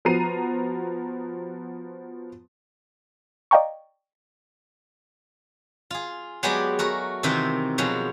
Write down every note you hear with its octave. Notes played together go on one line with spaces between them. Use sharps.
F3 B3 F#4 A#5 C7 D#7
D5 D#5 F5 G5 A#5 C#6
F4 G#4
F#3 G#3 B3 G4 G#4 D5
A3 F#4 A#4
C3 D#3 E3 C4 D#4 E5
B2 F3 F#3 G#3